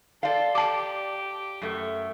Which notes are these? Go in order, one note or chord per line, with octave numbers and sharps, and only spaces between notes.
A4 D5 F5 C6
G4 A5 D6
F#2 A3